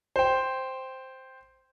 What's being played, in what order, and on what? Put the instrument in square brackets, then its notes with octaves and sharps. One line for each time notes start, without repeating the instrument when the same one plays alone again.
[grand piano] C5 G5